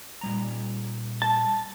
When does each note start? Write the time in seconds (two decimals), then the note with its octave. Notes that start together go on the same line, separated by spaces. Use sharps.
0.21 A#2 G3 A#5
1.22 A5